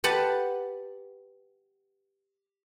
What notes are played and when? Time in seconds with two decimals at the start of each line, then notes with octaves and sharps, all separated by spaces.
0.04 G4 B4 F#5 A5